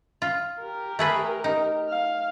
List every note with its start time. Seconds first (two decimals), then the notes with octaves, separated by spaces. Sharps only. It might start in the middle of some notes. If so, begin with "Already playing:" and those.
0.22 F4
0.59 G4 A#4
0.99 A3 G#4 B4
1.44 D#4
1.89 F5